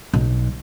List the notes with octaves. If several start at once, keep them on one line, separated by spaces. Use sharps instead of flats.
B1